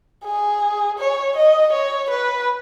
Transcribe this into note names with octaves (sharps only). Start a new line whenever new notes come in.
G#4
C#5
D#5
C#5
B4